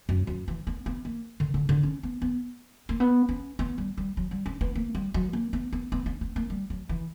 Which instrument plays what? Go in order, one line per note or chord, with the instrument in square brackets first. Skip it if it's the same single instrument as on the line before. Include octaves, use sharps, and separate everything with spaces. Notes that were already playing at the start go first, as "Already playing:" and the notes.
[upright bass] F#2
F#2
E3
B3
B3
A#3
D3
D3
D3
C#4
B3
B3
A#3
B3
C#4
B3
G3
G3
F#3
G3
C#4
B3
A#3
G3
F#3
A#3
B3
B3
B3
C#4
B3
A#3
G3
F#3
E3